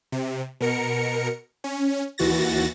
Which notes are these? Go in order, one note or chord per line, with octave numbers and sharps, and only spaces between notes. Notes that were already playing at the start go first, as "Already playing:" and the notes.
C3
B2 A#4 C#7
C#4
D#2 E3 F#4 A6 A#6